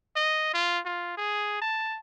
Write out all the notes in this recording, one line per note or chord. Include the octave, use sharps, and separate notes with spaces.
D#5
F4
F4
G#4
A5